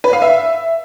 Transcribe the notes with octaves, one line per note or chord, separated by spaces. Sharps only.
B4
F5
E5